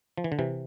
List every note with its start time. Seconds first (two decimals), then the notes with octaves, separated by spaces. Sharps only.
0.18 F3
0.24 E3
0.32 D3
0.39 C3 E3